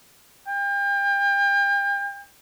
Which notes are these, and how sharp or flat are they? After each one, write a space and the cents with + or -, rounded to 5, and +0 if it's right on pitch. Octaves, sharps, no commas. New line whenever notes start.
G5 +35